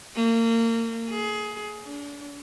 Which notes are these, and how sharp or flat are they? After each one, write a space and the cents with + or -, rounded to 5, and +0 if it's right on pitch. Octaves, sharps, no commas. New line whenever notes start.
A#3 -30
G#4 +20
D4 -35